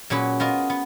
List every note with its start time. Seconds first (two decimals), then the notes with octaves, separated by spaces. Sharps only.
0.10 A#2 F#3 C#4 G#4 B4
0.40 B3 F4 A#4 D#5
0.70 B3